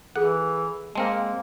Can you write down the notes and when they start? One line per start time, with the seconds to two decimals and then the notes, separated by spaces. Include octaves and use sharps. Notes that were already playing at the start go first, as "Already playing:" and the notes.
0.16 E3 F4 G#4 A4 F#5
0.95 G#3 A#3 C4 A#4 F5 G5 A5